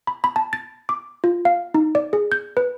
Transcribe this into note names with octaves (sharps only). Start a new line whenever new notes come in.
B5
B5
A5
A6
D6
F4
F5
D#4
D5
G#4
G6
B4